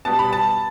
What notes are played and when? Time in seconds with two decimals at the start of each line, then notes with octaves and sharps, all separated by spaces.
0.05 B2 G3 B3 A5
0.19 B5
0.33 A5